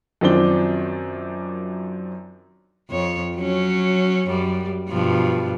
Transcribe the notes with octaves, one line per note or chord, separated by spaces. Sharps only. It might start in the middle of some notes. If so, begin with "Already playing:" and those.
F#2 D#3 F3 C4 D4 G7
F2 C#5
F#3 C#4
F#2 G3
G2 B2 F3